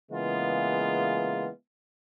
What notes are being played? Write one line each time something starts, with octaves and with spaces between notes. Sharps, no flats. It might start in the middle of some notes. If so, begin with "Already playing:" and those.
C#3 E3 G#3 A#3 B3 F4